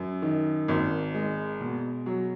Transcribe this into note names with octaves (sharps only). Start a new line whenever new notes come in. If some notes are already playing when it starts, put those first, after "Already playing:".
Already playing: F#2
D#3
G#1
G#3
B2
F#3